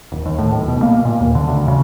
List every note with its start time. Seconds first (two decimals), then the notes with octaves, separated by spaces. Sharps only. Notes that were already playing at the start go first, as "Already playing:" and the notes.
0.12 D#1
0.26 D#2
0.39 A2
0.51 D1
0.68 B2
0.83 A#3
1.05 A#2
1.20 D#2
1.35 D3
1.48 D2
1.68 C#3